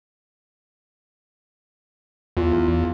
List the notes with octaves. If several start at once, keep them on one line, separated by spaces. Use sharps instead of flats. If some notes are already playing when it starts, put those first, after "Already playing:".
E2 F4